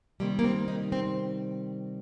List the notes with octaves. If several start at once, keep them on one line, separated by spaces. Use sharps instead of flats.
C3 D#3 G3 A#3
A#3
C4
D#4
C4